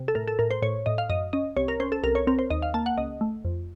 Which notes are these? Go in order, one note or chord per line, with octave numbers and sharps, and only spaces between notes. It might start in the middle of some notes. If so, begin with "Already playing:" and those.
Already playing: C3
A4
A2 A#4
A4
A2 A#4
C5
A2 C#5
A2 D#5
F5
F#2 D#5
C#4 D#5
C2 C#5
A#4
C#4 C5
A4
C2 A#4
C#5
C4 A#4
C5
D#2 D#5
F5
A#3 A5
F#5
C#2 D#5
A3
F2